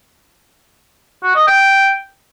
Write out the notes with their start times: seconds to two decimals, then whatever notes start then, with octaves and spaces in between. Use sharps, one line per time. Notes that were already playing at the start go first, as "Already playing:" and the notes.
1.23 F#4
1.35 D#5
1.47 G5